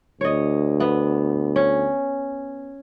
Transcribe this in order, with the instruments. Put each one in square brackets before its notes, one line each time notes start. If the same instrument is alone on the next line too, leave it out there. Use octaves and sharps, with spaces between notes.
[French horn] D2 [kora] C#5 D#5
[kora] B3
C#4